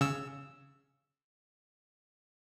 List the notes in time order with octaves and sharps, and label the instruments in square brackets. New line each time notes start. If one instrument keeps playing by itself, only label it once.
[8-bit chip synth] C#3 E6